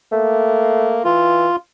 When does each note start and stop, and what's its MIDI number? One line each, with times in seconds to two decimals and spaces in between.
0.12 1.11 57
0.12 1.01 58
1.04 1.47 52
1.04 1.56 65